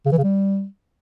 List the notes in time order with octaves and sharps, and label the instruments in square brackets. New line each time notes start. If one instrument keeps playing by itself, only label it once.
[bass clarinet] C#3
E3
C#3
G3